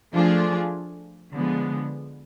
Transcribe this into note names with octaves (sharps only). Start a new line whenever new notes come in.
F3 A3 D4 F4 G#4
D3 F3 G#3 B3